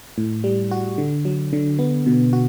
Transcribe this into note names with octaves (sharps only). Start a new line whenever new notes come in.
A2
G3
F#4
D3
F#3
D3
B3
B2
F#4